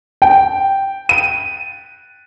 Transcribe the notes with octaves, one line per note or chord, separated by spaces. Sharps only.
G5
D#7